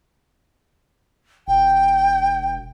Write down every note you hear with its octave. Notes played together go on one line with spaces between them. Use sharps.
E1 G5